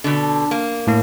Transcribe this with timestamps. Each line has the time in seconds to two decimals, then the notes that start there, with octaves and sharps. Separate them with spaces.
0.04 B2 D3
0.51 A#3
0.87 A2 A#3